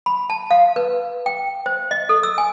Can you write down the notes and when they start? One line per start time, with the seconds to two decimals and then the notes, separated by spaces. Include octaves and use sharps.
0.06 B5
0.30 A5
0.51 F5
0.76 B4
1.26 G5
1.66 C5
1.91 D#5
2.09 A4
2.23 E6
2.38 G#5